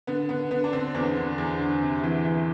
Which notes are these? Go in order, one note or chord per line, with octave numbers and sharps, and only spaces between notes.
D3 B3
D3 B3
D3 B3
D4
D3 C4
E2 B3 D4
D3
E2
D3
C3
E3
E3